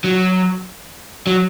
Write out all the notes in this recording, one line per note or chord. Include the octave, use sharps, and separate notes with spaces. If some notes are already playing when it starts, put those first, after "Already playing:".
F#3
F#3